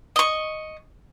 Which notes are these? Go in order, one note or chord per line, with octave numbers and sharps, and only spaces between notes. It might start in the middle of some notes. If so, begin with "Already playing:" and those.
D#5 C#6